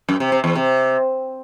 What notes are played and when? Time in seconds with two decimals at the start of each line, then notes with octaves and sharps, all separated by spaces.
0.09 F#2
0.20 C3
0.32 C3
0.44 E2
0.55 C3